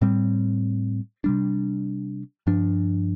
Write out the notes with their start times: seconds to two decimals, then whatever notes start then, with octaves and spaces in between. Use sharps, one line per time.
0.02 A2 G3 C4
1.24 C3 G3 D4
2.47 G2 F3 D4